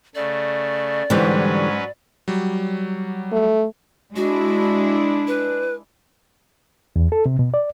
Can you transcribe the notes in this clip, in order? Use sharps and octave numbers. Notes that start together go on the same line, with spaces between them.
C#3 A3 D5
G#2 D3 E3 F#3 G3 C#4 B4 C5
F#3 G3
A3
G#3 D4 E4 F#4
B4
E2
A4
C3
B2
D5